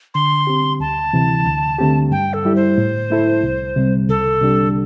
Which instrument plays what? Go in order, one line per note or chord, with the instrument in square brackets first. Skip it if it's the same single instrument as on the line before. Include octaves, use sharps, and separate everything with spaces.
[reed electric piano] D3 [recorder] C6
[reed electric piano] C4 G4
[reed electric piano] D2 [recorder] A5
[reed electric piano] C3 E3
D2
D3 A3 C4 G4
[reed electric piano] G2 [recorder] G5
[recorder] A4
[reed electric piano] G3 E4 G4
[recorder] C5
[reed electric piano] A2
A3 E4 A4
C2
C3 G3 C4
[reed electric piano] C2 [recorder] A4
[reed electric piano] C3 G3 D4 G4